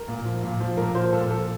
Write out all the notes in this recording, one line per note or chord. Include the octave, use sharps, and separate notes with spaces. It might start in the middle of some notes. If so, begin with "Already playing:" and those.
Already playing: A#4
A#2
F3
A#2
F3
A#2 A#4
F3 C5
A#2 A4
F3 A4